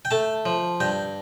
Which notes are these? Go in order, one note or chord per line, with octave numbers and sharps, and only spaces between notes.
G5
A3 A5
F3
G2 G5